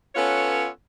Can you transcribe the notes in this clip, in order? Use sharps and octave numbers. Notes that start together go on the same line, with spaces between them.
B3 C#4 F4 A4 B4 C#5